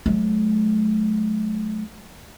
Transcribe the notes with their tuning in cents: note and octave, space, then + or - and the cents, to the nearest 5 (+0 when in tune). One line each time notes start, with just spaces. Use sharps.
F#3 +0 A3 -35